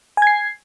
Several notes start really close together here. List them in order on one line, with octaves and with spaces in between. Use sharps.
G#5 G#6 C7